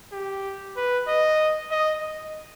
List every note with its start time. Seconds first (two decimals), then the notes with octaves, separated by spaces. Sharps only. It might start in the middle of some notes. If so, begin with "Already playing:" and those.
0.13 G4
0.77 B4
1.08 D#5
1.71 D#5